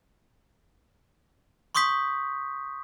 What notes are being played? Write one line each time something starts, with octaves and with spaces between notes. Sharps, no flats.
C6 C#6 D#6 G6 B6